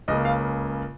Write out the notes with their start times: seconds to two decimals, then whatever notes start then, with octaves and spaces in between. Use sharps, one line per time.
0.08 C#2 C#3 A#3 D#5
0.25 F5